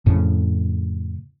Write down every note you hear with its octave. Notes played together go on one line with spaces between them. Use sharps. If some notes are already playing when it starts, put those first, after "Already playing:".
F2 A2 C#3